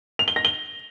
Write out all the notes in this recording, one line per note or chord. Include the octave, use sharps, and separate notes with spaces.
F7
G7
A#6
G7